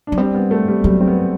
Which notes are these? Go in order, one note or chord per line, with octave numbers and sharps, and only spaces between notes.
F#3 D4
G3 C4
B3
A3
G3
F#3 G3
C4
B3